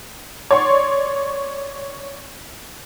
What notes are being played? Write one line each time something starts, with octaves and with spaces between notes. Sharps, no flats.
C#5 D5 C6 C#6